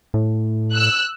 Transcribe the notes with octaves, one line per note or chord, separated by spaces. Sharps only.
A2
E6 F#6